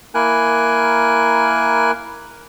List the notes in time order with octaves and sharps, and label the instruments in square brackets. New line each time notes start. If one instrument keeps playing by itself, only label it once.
[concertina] A#3 E4 A#4 G#5 F#6